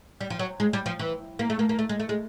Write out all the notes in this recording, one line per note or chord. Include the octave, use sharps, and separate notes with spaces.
G3
F3
F#3
G#3
G3
F3
E3
A#3
A3
A#3
A#3
A3
G#3
A3
G#3